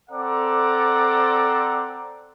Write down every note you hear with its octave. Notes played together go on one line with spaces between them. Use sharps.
C4 A4 D5 F#5 A#5 D6